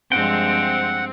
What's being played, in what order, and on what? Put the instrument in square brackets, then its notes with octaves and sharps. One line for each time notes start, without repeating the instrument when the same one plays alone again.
[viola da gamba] G2 F3 G#3 [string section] C4 [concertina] F#5 [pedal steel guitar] G5